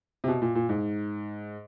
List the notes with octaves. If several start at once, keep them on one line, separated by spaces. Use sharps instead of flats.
C3
B2
A#2
A#2
G#2